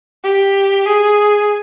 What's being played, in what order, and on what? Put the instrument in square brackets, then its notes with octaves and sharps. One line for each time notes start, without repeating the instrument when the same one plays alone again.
[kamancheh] G4
G#4